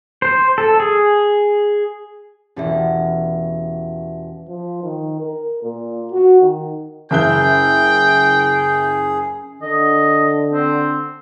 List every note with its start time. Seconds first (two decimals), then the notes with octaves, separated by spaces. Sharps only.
0.22 C5
0.58 A4
0.80 G#4
2.57 E1 E3 B3 C#4 G4 E5
4.49 F3
4.83 D#3
5.20 A#4
5.63 A#2
6.12 F#4
6.41 D#3
7.11 F#1 G#4 E5 G5 G6
9.62 D3 D#5
10.52 C4